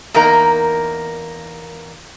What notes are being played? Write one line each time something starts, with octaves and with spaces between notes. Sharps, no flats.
E2 A#3 D#4 A#4 A#5